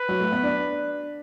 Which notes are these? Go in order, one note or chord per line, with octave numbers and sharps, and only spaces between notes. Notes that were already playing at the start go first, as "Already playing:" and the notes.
Already playing: B4
F#3
A3
B3
D4